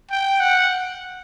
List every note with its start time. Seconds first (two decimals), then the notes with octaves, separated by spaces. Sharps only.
0.11 G5
0.40 F#5